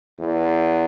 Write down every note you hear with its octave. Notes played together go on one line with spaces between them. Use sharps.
E2